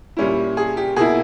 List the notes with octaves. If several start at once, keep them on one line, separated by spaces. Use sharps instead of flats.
A#2 G3 C#4 E4
G#4
G4
B2 A#3 E4 G#4